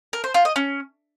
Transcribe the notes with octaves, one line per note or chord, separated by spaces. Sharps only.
A#4
C5
F4
D#5
C#4